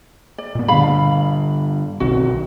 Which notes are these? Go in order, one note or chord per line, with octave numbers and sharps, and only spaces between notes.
D5
A#2 B3
G2 D3 F5 B5
B1 D#3 C4 F#4